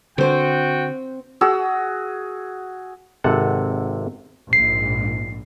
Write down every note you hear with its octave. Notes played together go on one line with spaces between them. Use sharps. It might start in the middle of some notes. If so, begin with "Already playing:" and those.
D3 C4 F#4 C5 G5
F#4 G#4 E6
G#1 C3 A4 F#5
A#1 G#2 C7